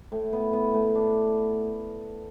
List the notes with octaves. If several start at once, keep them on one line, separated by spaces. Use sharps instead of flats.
A2
B3
B3
A2
D4